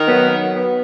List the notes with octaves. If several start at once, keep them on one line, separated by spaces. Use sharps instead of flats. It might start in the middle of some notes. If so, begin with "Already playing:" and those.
Already playing: D#3
F#3 B3
B3
B3